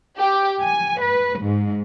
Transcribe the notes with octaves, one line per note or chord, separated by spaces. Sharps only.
G4
G#5
B4
G#2